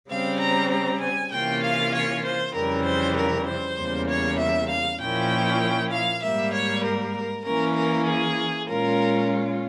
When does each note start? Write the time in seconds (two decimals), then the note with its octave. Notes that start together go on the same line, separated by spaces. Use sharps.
0.10 C#3 G3 C4 F5
0.40 A#5
0.71 A#5
1.02 G#5
1.32 C3 E3 A#3 C#4 F4 G5
1.63 F5
1.94 C#5
2.25 C5
2.55 F2 C#3 E3 G3 A#4
2.86 C5
3.16 A#4
3.47 C5
3.78 E2 C#3 G3 A#3
4.09 C#5
4.39 E5
4.70 F5
5.01 A#2 F3 A#3 C#4 E4 G5
5.92 F5
6.23 G#2 G3 A#3 E5
6.54 C#5
6.84 A#4
7.46 E3 A#3 C#4 A#4
7.77 A#4
8.07 G#4
8.69 A#2 G#3 C#4 F4 A#4